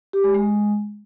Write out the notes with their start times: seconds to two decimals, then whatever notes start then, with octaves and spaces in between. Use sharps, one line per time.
0.13 G4
0.24 G#3
0.34 G#3